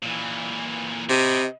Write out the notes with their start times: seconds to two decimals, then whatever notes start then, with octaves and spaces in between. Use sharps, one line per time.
0.02 A#2 E3
1.09 C3 B4 D#5